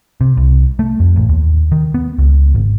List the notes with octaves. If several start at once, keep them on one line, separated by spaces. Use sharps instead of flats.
C3
C2
A3
F2
A1
D#2
D#3
B3
C#2
G#1